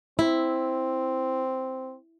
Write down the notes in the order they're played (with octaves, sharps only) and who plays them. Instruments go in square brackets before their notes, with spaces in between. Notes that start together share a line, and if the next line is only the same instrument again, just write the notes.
[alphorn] C4 [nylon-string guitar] E4